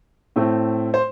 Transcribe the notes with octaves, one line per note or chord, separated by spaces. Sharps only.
A2 A3 C4
C5